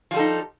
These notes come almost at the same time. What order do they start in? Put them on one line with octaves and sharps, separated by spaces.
F3 G3 A4 D#4